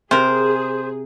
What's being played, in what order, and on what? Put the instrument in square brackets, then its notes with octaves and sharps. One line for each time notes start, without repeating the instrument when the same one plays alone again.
[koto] C3 A#4 [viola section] G#4 [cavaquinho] C5